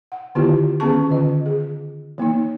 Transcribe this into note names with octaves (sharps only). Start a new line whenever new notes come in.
F#5
D3 D#3 B3 E4 F4 G4
D#3 B3 C#4 G#4 A5 C#6
D3 D#3 F4 D#5
G#4
E3 A#3 B3 D#4